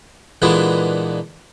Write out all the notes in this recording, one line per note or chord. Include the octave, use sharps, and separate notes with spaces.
A#2 D3 E3 G#3 B3